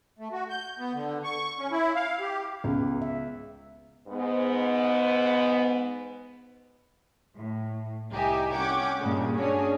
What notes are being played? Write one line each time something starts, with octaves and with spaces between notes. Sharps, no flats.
A3
F#4
G6
B3
D3
C#6
C#4
E4
F5
G4
C#2 B3
E5
G#2 B3
A2
C2 D#4 G4 E5 G#5
C#4 F#5 G5 D6 G#6
G2 A#2 C#3 G#3
C#4 D4 F#4 G#4 C#5 G#5